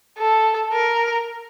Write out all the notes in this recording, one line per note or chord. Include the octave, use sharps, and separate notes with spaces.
A4
A#4